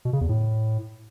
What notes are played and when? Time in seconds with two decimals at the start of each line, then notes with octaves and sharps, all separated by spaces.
0.05 B2
0.13 C#3
0.21 E2
0.29 A2